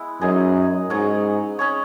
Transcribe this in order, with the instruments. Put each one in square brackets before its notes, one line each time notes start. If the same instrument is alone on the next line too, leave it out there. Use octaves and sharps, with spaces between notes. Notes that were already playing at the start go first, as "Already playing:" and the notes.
Already playing: [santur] G#3 B3 E4
[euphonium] F#2 [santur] D#4 G#4 D#5
[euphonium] G#2 [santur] F#3 C#4 G#4 C#5
[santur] C#4 G#4 C#5